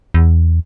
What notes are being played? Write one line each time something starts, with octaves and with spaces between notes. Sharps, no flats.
E2